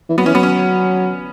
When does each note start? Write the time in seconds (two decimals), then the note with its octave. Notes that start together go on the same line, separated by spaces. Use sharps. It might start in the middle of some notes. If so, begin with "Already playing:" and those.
0.09 E3
0.17 F#3 B3
0.26 E3 C#4
0.35 F#3 B3
0.43 C#4